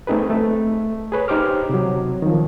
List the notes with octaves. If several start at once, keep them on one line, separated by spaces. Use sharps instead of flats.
A3 C4 D#4 G#4 B4
A3
G#4 B4 C#5
D#4 G4 C5 D6 F6
C3 F#3
D#3 F3